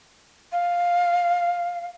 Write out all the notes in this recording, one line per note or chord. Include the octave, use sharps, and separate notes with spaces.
F5